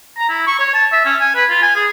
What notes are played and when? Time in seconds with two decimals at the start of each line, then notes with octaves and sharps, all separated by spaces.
0.18 A#5
0.29 E4
0.47 C#6
0.59 C#5
0.74 A5
0.92 E5
1.05 C#4
1.20 G#5
1.35 B4
1.50 F4
1.62 G#5
1.76 G#4